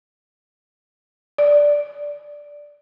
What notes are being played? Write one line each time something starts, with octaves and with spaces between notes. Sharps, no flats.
D5